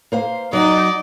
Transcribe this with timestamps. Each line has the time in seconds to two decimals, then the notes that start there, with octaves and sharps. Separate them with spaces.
0.12 A#3 C5 F5
0.53 F#3 D#4 D5 D#5